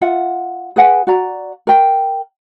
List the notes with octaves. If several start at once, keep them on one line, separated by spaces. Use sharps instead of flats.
F4 E5 F#5
G#4 B4 F#5 G#5
F#4 D5 A#5
A#4 G5